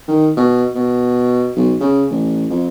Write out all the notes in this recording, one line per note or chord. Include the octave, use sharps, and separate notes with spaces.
D#3
B2
B2
B1
C#3
A1
F2